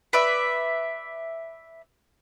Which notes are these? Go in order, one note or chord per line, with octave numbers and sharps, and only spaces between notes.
B4 D5 E5